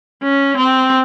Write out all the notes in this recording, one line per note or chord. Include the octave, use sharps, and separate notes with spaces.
C#4
C4